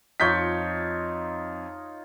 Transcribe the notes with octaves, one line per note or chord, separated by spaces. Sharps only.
F2 D#4 F4 C#5 G6 B6